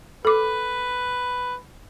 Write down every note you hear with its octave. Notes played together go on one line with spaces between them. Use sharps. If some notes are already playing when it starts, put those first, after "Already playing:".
A4 B4 D6